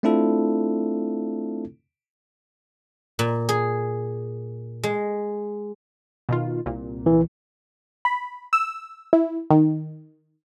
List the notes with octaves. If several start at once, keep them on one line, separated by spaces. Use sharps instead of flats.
A3 C4 D4 E4 F4 A4
A#2
G#4
G#3
B2 D#3 F4
C2 A#2
E3
B5
E6
E4
D#3